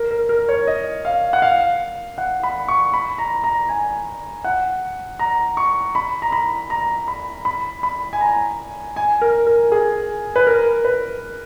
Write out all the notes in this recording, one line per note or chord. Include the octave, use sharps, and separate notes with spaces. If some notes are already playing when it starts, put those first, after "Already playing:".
Already playing: A#4
A#4
A#4
C#5
D#5
F5
F#5
F5
F#5
B5
C#6
B5
A#5
A#5
G#5
F#5
A#5
C#6
B5
A#5
B5
A#5
B5
B5
B5
G#5
A#5
G#5
A#4
A#4
G#4
B4
A#4
B4